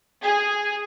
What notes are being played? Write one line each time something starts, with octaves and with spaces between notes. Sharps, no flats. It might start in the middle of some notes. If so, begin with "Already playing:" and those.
G#4